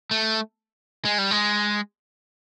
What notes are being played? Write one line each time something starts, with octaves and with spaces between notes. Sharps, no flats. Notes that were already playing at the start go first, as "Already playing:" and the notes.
A3
G#3
G3
G#3